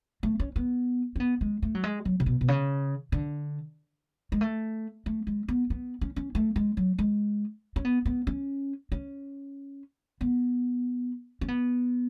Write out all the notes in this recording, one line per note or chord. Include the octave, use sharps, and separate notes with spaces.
A3
C#4
B3
C#4
B3
G#3
A3
F#3
G#3
F#3
C#3
B2
B2
C#3
D3
G#3
A3
A3
G#3
B3
B3
C#4
C#4
A3
G#3
F#3
G#3
C#4
B3
B3
C#4
C#4
B3
C#4
B3